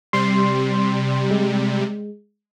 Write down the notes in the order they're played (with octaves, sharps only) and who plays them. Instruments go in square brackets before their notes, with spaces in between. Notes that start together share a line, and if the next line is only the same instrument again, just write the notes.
[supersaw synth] C3 G3 [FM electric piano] C6
[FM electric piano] G#3